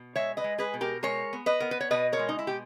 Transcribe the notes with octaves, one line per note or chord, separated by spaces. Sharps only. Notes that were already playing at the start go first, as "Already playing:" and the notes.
Already playing: B2
G#3 C#5 E5
B4 D#5
G#3
G#4 B4
B2
G4 A#4
G#3 A#4 C#5
B3
B4 D#5
B3 A#4
B4
C#5
B2 B4 D#5
A#4 C#5
G#3
D#4
E4
B2 G4